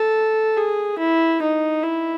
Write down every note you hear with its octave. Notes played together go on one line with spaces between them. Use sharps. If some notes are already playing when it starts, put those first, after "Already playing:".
Already playing: A4
G#4
E4
D#4
E4